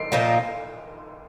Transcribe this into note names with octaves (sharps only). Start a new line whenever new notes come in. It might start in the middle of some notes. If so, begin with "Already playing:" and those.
Already playing: C7 D7
A#2 F3 A#3 D#4